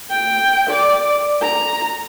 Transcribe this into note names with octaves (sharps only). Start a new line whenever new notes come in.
G5
D5
A#5